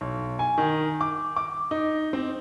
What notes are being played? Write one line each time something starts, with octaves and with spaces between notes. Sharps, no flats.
B1
G#5
D#3
D6
D6
D#4
C4